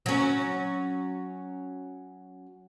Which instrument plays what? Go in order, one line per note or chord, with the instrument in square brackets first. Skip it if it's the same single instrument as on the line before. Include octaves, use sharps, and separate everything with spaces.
[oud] F#3 C#4